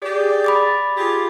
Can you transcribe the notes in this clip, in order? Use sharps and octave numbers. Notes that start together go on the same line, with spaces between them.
G4 G#4 D5
B5 D6 A6
F4 G4 G#4